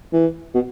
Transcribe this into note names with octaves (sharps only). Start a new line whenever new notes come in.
E3
B2